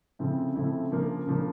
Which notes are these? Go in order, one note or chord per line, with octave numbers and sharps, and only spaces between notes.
C#3 F3 A3 C4 E4
C#3 F3 A3 C4 E4
C#3 F3 A#3 D4
C#3 F3 A#3 D4